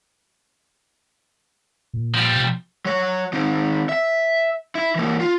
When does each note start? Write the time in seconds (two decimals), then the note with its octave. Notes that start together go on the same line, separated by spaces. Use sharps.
1.93 A#2
2.14 F3 G3
2.36 B2
2.85 F#3 C#5
3.33 D#3 C4
3.89 E5
4.75 E4
4.95 E3 A#3
5.20 F4